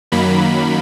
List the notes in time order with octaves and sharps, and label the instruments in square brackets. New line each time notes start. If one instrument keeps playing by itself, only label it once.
[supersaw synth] F#2 D#3 F#3 A#3 B5